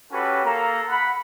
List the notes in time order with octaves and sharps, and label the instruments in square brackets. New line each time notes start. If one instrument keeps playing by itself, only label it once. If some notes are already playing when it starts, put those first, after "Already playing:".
[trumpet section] C#4 F#4 G4 A4 B4 C#5
A#3 A4 A#5
F#5 B5